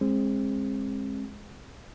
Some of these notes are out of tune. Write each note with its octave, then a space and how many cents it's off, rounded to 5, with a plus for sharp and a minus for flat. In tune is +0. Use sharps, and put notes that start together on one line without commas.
G#3 -10 C4 +30